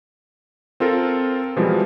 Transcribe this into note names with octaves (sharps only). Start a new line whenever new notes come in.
C4 F4 A4 A#4
B2 E3 F3 G3 G#3